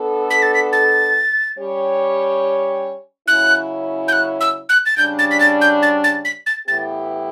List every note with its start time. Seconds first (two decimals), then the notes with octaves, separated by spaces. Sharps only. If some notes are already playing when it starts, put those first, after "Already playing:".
Already playing: B3 D4 A4
0.30 B6
0.42 A6
0.54 B6
0.73 A6
1.58 G3 C#4 G4 C#5
3.28 C#3 F#3 C#4 E4 F#6
4.08 G6
4.12 F#6
4.41 E6
4.69 F#6
4.86 A6
4.97 C#3 G3 D4 G6
5.19 A6
5.31 B6
5.40 A6
5.61 G6
5.82 A6
6.04 A6
6.25 B6
6.46 A6
6.68 A2 E3 B3 E4 G4 A6